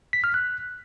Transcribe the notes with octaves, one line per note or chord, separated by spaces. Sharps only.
B6
F6
F#6